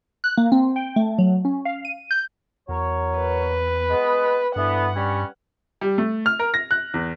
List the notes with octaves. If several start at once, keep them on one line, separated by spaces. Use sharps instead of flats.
F#6
A#3
C4
G5
A3
F#3
C#4
F5
D#7
G6
E2 F#3 A#4 C#5
B4
G#3 B3
G2 D3 E3 B3 F#5
G3 C#4
G3
A3
F6
A#4
A#6
F#6
E2